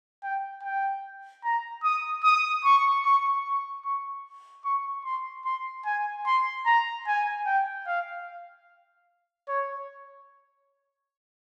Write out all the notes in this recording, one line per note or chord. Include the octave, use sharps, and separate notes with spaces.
G5
G5
A#5
D#6
D#6
C#6
C#6
C#6
C#6
C#6
C6
C6
G#5
C6
A#5
G#5
G5
F5
C#5